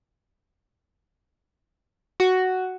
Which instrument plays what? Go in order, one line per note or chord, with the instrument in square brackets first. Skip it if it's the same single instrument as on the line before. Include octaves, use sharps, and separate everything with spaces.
[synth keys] F#4